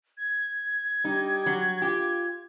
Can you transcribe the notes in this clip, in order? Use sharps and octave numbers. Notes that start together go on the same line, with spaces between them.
G#6
G3 D#4
F#3
F4 G4